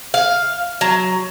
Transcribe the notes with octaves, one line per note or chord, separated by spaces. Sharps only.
F5
F#3